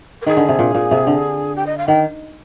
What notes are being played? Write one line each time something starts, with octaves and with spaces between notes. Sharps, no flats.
A#4
D#3 G#4
D3
C3
A#2
A#2
C3
D3
G4
D#5
F5
D#3 G5